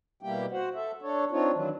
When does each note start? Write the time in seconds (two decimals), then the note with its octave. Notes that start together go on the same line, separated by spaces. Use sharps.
0.23 B2 G3 A#3 E4 G4 G5
0.52 F#4 C5 F#5
0.75 A4 E5
1.02 D4 A4 C#5
1.31 C4 D4 D#4 F4 C#5
1.53 D#3 E3 F#3 D4